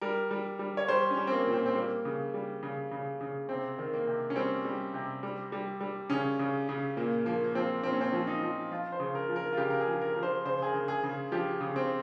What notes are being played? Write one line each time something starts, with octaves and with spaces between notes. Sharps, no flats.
G3 A#4
G3
G3
C#5
G3 C5
C#4
G3
C4
A#3
A#2
C4
C4
G3 A#3
C#3
G3
C#3
C#3
C#3
C3 C4
D#3
A#3
C3
C#4
G3 C4
G3
C3
G3
G3
G3
C#3 C#4
C#3
C#3
A#2 A#3
F3 A#3
A#3
F3 C4
A#2 C4
C#4
C4
F3
D#4
F3
F3 F4
C5
C#3
A#4
F3
A#4
F4
C#3 G4
A#4
G#4
F3
A#4
F3 A#4
C5
C#3 C5
G#4
A#4
C#3
G#4
C#3
F3 G4
C#3
C4